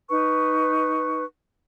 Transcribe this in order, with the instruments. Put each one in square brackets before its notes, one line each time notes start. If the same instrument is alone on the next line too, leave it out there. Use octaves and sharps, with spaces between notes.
[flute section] D#4 B4 C#6